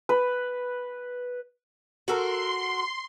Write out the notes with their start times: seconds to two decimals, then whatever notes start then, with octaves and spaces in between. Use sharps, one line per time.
0.09 B4
2.08 F#4 A4 A#4 C6